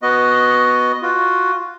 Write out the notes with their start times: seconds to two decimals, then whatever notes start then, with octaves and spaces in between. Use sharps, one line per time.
0.02 B3 F#4 D#5
1.02 F4 F#4